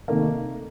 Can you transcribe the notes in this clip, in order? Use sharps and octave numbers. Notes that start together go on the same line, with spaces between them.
C3 D#3 A3 A#3